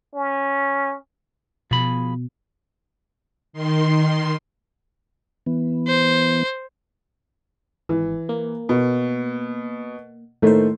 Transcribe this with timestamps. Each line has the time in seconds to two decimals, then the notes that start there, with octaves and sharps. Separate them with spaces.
0.15 C#4
1.71 B2 F3 G#4 B5
3.53 D#3 C6
5.46 E3 B3
5.88 C5
7.89 G#1 E3
8.29 A#3
8.69 B2
10.42 A2 D#3 A3 A#3 C5